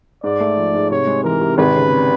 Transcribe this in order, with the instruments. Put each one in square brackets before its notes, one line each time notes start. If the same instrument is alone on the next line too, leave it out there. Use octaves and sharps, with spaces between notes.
[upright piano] G#2 [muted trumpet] D5
[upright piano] A3
F3
G#2
[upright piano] C3 [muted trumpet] C#5
[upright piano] G#3
[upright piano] E3 [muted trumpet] A#4
[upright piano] C3
[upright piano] G#1 [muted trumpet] B4
[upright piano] C#3